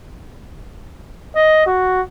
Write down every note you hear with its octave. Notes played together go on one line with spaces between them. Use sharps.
D#5
F#4